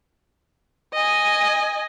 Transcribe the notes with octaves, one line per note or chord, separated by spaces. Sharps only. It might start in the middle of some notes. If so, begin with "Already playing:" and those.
D#5 G#5